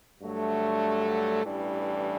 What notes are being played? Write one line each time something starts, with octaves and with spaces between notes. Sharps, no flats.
G2 D3 F#3 A3
A1 G2 E3 G3 D4